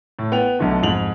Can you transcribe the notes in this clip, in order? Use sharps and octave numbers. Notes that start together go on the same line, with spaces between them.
A2
B3 G5 F7
B1 D3 A3
F2 G#2 F7 F#7